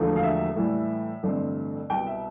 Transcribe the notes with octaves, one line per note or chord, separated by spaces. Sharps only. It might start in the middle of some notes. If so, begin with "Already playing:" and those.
Already playing: E1 E2 D3 F3 A3
F5
E5
A2 E3 G3
A1 G2 D3 G3 C4
C2 B2 B3 G5
E5